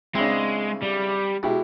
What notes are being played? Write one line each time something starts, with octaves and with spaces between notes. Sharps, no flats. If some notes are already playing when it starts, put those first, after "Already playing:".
C#3 G#3 C4 D4 E4
G3
B2 G#3 E4 G4